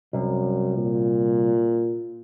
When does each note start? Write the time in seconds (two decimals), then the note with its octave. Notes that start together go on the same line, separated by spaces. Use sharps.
0.13 C2 F#2
0.77 A#2